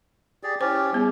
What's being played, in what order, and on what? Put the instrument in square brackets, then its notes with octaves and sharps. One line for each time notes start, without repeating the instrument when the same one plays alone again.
[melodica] G4 G#4 D5
[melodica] C#4 G4 [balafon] E4 C5
[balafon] G3 B3 G#4